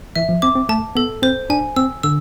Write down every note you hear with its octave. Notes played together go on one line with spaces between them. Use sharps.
E3 E5
F3
C4 D6
C4
A3 A5
B3 A4
C4 C5
D4 G#5
C4 E6
D3 E6